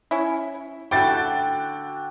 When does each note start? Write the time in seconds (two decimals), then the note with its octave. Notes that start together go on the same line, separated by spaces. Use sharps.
0.11 C#4 E4
0.91 D3 A3 E4 F#4 A4 G5 D6 A6